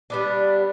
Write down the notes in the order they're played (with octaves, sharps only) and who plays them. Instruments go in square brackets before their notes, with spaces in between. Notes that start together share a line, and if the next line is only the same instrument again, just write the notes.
[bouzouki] G3 B3 D4